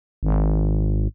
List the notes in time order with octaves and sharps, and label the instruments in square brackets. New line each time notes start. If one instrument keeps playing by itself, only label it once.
[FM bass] G#1